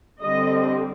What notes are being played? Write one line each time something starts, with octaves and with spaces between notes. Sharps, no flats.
D3 G3 C4 D#5